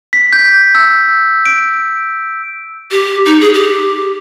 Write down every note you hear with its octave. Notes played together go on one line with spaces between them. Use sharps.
B6
G6
E6
D7
G4
D#4
G#4
G4